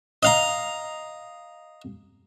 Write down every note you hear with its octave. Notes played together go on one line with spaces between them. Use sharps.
D#5 F5 A#5